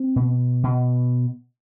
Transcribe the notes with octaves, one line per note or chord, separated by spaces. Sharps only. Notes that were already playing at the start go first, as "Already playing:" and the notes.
Already playing: C4
B2
B2